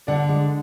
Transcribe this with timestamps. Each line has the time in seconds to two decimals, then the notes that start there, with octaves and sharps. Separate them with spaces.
0.07 D3 D5 F#5
0.29 G#3